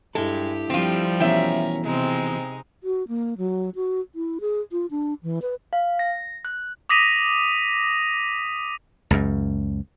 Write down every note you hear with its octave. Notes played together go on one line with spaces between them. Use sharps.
G2 G#3 E4 G4 A4
F3 G3 C4 F4
B2 E3 C#4 A#4 E5 G5
C3 G#3 C4 D#4
F#4
A#3
F#3
F#4
E4
G#4
F4
D4
E3
B4
F5
A#6
F#6
D6 D#6 A#6 B6 D#7 F7
C#2 F#2